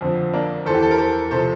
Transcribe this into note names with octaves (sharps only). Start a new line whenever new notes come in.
F2 D3 F3 C4
A#3 D4
E2 E3 A4 C5
G4
A4
A#4
A4 C5
C3 F3 A4 C5